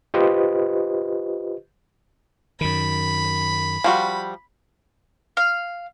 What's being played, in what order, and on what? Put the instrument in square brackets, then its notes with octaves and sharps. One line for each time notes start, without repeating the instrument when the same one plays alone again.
[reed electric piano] F4 G4 B4 C5 D#5
[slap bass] F#2 D#3 [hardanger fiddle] B5
[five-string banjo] F3 G3 F#4
[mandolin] F5